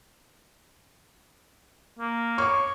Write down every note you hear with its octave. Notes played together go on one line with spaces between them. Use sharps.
A#3
C#5 C#6 D6